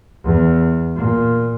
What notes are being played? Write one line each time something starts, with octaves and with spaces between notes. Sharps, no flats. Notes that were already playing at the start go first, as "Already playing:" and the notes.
E2
A#2